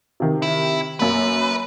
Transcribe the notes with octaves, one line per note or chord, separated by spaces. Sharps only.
C3 D#3
E4
F#2 A#3 B4